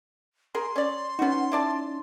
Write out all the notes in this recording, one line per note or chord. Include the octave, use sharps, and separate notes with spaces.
G#4 A#4 C6
C#4 D5
B3 C#4 D#4 F#4
E4 D5 A5